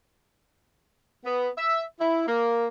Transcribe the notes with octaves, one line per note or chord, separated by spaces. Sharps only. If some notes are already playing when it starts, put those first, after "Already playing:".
B3
E5
E4
A#3